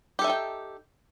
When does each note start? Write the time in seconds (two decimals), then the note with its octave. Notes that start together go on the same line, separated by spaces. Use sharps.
0.19 G4
0.22 A4
0.24 E5
0.27 D#4
0.30 G5